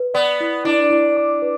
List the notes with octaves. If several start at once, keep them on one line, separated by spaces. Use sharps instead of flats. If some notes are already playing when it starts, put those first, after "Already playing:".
Already playing: B4
B3 D5
E4
D4 E4
E4
D6
B4